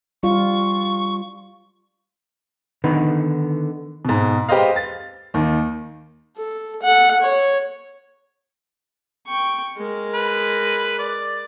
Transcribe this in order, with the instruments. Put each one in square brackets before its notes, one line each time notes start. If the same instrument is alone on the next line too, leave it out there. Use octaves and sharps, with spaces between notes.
[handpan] G3 F4 [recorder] C#6
[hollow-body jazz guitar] D3 D#3 B3 D#4 B4
[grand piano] G#2 B2
G#3 G4 B4 C5 D#5 F5
A6
D#2 D#3
[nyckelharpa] A4
A4 F#5
C#5
G5 C#6
G#3 A#4
[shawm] B4
D5